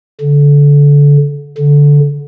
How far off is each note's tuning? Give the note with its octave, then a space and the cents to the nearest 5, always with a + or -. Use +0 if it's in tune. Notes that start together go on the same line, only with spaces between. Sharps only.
D3 -25
D3 -15